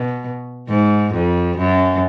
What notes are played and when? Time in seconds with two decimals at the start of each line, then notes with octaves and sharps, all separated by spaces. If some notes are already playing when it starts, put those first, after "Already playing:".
Already playing: B2
0.69 G#2
1.14 F2
1.58 F#2